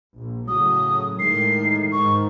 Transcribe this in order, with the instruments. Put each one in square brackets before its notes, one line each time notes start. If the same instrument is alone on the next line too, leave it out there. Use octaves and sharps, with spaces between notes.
[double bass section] A#1
[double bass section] A2 C#3 F#3 [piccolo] D#6
[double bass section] A2 D#3 G#3 [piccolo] C7
[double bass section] G#2 D#3 [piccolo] C#6